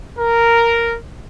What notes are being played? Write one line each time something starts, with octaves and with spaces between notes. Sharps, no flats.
A#4